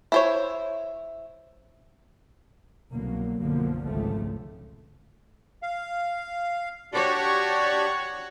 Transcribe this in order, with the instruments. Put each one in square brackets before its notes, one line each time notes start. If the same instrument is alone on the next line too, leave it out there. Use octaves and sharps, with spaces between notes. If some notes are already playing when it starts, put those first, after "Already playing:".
[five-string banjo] E4 C5 C#5
[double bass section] C2 B2 D3 F#3 A#3
B1 F#2 B2 D3 F3 A#3
G#1 C#2 F3 A3
[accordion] F5
[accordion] D4 G4 D5 [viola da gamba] F#4 C#5